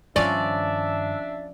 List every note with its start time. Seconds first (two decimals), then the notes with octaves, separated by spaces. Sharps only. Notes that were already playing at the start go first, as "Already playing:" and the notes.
0.16 G2 D#3 F3 C#4 D4 D5 E5